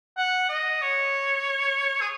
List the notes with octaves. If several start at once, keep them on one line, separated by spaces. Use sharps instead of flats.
F#5
D#5
C#5
G#4